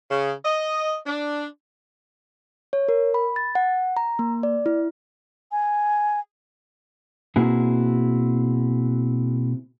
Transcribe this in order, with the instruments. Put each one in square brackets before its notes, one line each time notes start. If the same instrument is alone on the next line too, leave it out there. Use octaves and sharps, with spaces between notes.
[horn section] C#3
D#5
D4
[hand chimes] C#5
A#4
B5
A6
F#5
A#5
A#3
D5
E4
[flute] G#5
[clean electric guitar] B2 A#3 C4 E4 F#4 G#4